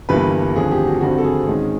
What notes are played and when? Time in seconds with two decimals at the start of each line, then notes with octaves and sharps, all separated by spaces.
0.09 G1 G2 E3 G3 A#3 B4
0.55 F1 D#2 D3 F3 G#4
0.71 G4
0.87 F#4
1.01 G#1 G2 D3 G3 C4 F#4
1.18 A4
1.24 G#4
1.47 G#2 D#3 G#3 C#4